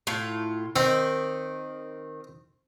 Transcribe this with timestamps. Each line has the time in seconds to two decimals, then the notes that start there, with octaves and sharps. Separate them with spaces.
0.07 A2 F4
0.76 D#3 C4